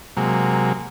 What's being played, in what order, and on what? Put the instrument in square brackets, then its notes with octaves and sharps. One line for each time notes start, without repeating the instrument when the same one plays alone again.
[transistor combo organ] C3 F#3 G#3 A#3